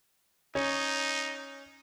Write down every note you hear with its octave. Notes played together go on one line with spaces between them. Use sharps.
C#4 D#4